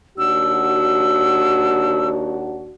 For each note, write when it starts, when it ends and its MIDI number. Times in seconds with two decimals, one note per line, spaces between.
0.18 2.75 39
0.18 2.75 62
0.18 2.75 66
0.18 2.09 88